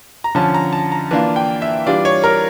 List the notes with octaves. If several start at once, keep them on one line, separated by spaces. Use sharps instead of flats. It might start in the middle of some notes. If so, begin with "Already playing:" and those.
A#5
D3 F3 C#4 A5
A#5
A5
A#5
E3 A#3 D4 F4 A5
G5
E5
E3 G3 D4 F4 D5
C#5
A#4